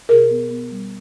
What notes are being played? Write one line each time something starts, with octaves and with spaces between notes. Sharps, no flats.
B2 G#4 A#4
B3
B3
G3